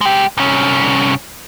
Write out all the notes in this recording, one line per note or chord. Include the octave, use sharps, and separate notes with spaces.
G#3 G4
C2 C#4